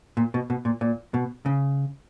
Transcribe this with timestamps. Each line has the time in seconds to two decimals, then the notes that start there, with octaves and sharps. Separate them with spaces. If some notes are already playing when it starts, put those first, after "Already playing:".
0.17 A#2
0.34 B2
0.50 B2
0.65 A#2
0.81 A#2
1.14 B2
1.46 C#3